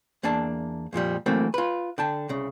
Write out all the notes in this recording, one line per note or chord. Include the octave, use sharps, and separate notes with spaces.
E2 A#3 D4 A5
F2 A#2 F3 G3
E3 F#3 A3 A#3 C4
F4 B4
D3 G5 A5
C2 C#3